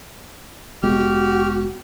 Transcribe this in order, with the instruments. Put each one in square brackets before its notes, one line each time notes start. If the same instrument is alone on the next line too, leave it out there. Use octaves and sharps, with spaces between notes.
[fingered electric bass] F1 G#3 B3 [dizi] F#4 [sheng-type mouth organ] G4 F6